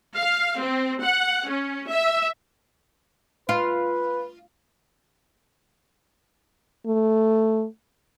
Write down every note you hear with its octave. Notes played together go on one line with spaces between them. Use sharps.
F5
C4
F#5
C#4
E5
F4 B4
A3